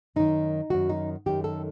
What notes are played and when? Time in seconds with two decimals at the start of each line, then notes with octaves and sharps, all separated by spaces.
0.16 F#2 D#3 D#4
0.70 F#2 D#3 F#4
0.89 D#4
1.26 F#2 D#3 G4
1.44 A4